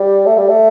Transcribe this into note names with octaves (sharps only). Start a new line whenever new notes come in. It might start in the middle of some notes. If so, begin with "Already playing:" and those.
Already playing: G3
A3
G3
A3